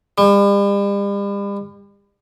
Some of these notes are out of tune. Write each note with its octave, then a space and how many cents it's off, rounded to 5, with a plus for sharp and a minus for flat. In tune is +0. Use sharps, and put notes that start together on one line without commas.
G3 +40